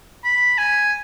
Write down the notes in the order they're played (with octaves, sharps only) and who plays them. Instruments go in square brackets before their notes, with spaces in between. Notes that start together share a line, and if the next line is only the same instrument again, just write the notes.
[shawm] B5
G#5